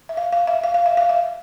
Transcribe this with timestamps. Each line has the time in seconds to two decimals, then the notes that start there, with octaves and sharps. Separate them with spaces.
0.09 E5
0.17 F5
0.33 F5
0.47 E5
0.64 F5
0.74 F5
0.86 E5
0.97 F5
1.09 E5